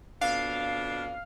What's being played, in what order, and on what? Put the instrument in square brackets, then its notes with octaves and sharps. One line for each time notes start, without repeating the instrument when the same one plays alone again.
[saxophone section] F2 B2 D4 [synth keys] F5